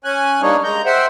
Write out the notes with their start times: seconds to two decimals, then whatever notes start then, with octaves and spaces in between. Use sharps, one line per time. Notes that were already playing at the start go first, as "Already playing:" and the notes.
0.04 C#4 G#5 F#6
0.42 G3 A#3 D4 D#4 C#5
0.64 G#3 A#5 G6
0.86 C5 E5 F#5 G5